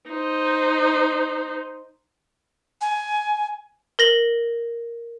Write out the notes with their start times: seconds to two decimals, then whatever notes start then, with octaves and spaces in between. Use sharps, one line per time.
0.10 D#4 C5
2.81 G#5
3.99 A#4 A#6 F#7